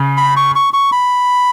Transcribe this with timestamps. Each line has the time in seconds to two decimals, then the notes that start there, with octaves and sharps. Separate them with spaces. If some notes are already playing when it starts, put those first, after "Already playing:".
Already playing: C#3
0.17 B5
0.37 C#6
0.55 C#6
0.73 C#6
0.92 B5